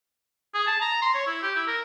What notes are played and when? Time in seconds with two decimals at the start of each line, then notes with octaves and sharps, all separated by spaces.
0.54 G#4
0.67 A5
0.82 A#5
1.02 C6
1.15 C#5
1.27 E4
1.43 G4
1.56 E4
1.68 A#4